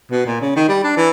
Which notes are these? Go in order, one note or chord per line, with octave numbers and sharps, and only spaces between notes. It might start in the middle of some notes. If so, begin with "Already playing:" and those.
B2
A#2
C#3
D#3
G3
D4
E3